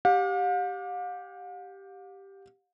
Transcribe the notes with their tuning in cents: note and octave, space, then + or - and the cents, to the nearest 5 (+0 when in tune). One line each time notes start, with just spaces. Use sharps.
G4 +0 F5 +45